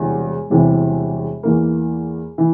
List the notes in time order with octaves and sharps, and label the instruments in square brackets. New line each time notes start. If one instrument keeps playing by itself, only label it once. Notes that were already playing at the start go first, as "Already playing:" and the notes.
Already playing: [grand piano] E1 E2 C3 E3 G3
E1 E2 C3 E3 G3
E2 E3 A#3
E3